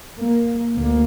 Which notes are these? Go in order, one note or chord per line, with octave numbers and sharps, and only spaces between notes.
A#3
D2 A#3